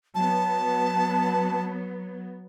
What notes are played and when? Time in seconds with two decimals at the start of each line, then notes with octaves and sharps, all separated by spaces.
0.15 F#3 B3 A5